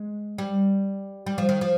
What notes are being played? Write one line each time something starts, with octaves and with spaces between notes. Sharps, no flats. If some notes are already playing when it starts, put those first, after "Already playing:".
Already playing: G#3
G3
G3
F3
D#3
F3